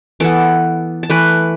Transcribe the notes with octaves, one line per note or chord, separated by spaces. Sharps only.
E3 B3 A4 A5
A5
E3 A3 B4 B5